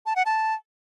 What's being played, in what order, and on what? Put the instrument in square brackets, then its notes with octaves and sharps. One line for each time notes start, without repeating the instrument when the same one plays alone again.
[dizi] A5
F#5
A5